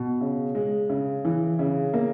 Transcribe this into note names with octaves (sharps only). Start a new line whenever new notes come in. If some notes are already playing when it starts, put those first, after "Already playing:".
Already playing: B2
C#3
G#3
C#3
E3
C#3
A#3